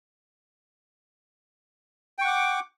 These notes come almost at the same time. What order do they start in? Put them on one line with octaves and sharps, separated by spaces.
G5 C#6 F#5 D6